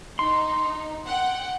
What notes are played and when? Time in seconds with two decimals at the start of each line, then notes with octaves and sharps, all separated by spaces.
0.19 D#4 C6
1.07 F#5 G5